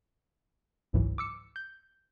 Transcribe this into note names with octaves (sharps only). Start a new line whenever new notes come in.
G#1 C#2 G#2 E3 F#3
D6 E6 C#7
G6